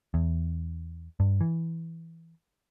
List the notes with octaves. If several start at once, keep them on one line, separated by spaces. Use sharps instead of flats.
E2
G2
E3